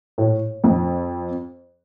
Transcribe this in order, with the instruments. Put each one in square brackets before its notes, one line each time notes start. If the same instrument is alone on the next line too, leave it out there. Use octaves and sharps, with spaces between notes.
[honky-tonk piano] A2
F2